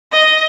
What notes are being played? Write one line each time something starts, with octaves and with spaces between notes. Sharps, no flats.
D#5